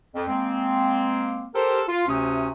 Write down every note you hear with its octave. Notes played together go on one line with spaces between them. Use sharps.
F2
G#3 A#3 C4
G4 A4 A#4 C5
F4
D2 C3 C#4 D#6